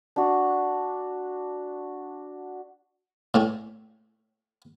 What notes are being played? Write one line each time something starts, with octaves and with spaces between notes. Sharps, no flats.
D4 F#4
A2 A3 C#4